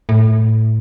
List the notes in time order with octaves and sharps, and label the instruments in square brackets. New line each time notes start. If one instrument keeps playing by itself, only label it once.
[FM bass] A2